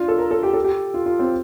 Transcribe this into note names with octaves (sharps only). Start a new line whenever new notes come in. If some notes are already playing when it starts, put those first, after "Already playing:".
Already playing: D4 F4
A4
A#4
A4
G4
A4
G4
F4
F4
C4